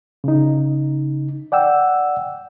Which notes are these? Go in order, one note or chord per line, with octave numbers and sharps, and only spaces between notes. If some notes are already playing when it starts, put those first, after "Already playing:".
C#3 D#4
D5 F#5 G5 E6